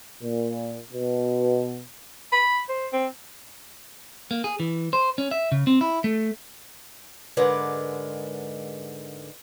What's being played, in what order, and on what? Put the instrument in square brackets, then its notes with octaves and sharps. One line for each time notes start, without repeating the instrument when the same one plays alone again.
[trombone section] A#2
B2
[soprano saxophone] B5
C5
C4
[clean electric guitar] A#3
G#4
E3
C5
C#4
E5
C#3
C4
E4
A3
[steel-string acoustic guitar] G#2 D3 G#3 A#4 B4 D5